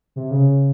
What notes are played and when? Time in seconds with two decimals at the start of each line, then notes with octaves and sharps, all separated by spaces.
0.16 C3
0.31 C#3